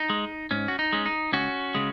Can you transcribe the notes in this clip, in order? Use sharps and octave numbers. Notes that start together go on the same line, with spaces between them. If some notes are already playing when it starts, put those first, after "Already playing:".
Already playing: D#4
G#3
G#2 C#4
F#4
D#4
G#3 C#4
D#4
C#2 C#4 F#4
C#3 G#3